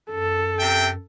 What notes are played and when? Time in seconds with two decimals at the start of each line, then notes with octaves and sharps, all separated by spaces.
0.11 F#2 A4
0.60 C3 E5 G5